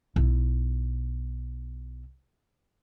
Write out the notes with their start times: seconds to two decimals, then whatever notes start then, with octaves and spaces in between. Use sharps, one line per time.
0.16 B1 E4